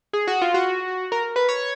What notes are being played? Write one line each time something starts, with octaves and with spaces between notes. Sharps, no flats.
G#4
F#4
F4
F#4
A#4
B4
C#5